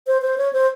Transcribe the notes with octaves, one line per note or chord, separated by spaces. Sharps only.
C5
C5
C#5
C5